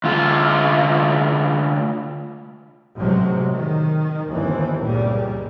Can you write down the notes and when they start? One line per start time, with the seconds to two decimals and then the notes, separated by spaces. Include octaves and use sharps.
0.04 D2 F4
2.97 A1 C3 F#3 G#3
3.53 D#3
4.29 G1 D#2 E3 C4
4.80 C#2 A#2 G3